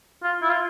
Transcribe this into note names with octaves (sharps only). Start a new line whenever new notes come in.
F4
E4
F4